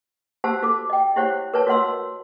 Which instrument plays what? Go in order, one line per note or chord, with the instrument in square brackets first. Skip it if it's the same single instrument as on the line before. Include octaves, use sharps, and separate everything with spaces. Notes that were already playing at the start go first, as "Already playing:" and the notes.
[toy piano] F#4 G4 C5 F#5 A5 E6
D#4 F#4 A4 D6
D#5 G5
E4 G4 C5 C#5 F#5
A#4 B4 C#5 A5
F#4 C#5 D#5 F#5 C6 E6